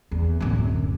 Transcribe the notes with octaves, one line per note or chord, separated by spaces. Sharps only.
E2
D1 F#2